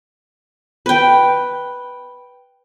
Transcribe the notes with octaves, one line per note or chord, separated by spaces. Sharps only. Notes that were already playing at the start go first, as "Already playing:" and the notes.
B4 G5